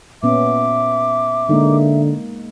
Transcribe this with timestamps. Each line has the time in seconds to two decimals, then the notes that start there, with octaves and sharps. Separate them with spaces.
0.23 A#2 B3 C#4 E5 D6
1.49 D3 G#3 A#3 D#4